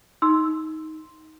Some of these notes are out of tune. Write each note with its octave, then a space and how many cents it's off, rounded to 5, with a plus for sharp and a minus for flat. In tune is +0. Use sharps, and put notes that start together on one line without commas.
D#4 +15 C6 +0 E6 +0